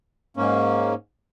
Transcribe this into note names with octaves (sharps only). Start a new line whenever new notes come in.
G#2 A#3 C#4